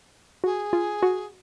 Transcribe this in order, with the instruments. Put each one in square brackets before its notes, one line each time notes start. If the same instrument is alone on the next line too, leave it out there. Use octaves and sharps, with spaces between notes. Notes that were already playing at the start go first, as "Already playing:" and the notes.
[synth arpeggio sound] F#4 [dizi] G#4
[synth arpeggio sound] F4
F#4